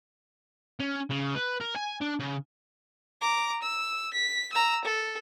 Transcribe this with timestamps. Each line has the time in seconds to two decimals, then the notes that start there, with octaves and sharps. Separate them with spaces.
0.80 C#4
1.10 C#3
1.35 B4
1.60 A#4
1.76 G#5
2.01 D4
2.20 C#3
3.22 A#5 D6
3.62 E6
4.14 B6
4.53 A#5 E6
4.85 A4